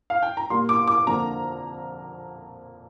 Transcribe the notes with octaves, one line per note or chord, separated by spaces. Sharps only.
F5
G5
A#5
A#2 G3 A#3 C6
D6
D6
F2 D3 A#3 A#5